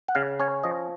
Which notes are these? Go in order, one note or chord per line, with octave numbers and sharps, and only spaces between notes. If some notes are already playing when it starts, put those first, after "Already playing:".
F#5
C#3 F5
C#4 C#5
F3 D#5